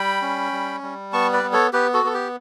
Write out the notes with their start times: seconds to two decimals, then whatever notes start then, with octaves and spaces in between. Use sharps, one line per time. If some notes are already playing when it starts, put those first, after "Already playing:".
Already playing: G3 G5 B5
0.22 C#4
0.52 G3
0.82 G3
1.13 B3 A5 C#6
1.33 B4 D5
1.43 B3
1.53 A4 C#5
1.73 B3 G4 B4
1.94 F#4 A4
2.04 B3 A4
2.14 G4